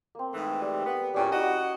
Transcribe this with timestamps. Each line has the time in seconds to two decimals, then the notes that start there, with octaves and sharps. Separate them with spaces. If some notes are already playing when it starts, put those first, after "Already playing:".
0.15 A#3 C4
0.32 G#2 E3 A3
0.61 G3
0.85 B3
1.14 E2 A#2 G3 C#4 A#5
1.31 E4 F#4 D#5 F#5